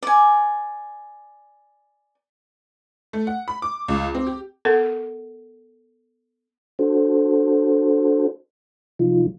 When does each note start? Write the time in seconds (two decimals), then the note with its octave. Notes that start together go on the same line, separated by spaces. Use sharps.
0.03 D5 G#5
3.13 A3
3.27 F#5
3.48 B5
3.62 D6
3.88 C#2
4.15 C4
4.27 G4
4.65 B3 A4 A#4 F#5
6.79 D4 F#4 A4 C5
8.99 C3 F3 F#3 D#4 F4